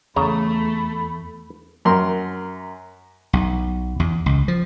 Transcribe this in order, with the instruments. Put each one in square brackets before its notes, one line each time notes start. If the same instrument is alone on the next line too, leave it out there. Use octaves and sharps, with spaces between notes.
[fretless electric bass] E2 [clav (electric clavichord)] C#3 A#5 [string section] A3 [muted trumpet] B5
[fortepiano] F#2 A#4 C6
[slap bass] B1
E2
C#2
F3